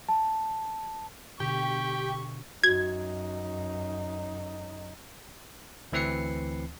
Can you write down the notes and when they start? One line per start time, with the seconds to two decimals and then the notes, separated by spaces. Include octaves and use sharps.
0.09 A5
1.40 B2 D3 G4 G5 C#6
2.64 F#2 D#4 F#4 G#6
5.92 D2 E3 C4 B4 C7 C#7